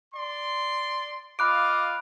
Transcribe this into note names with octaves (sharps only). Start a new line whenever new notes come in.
D5 C6
F4 D#5 F5 B5 D6 F#6 D7